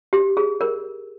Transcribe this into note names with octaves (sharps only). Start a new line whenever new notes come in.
G4
G#4
A#4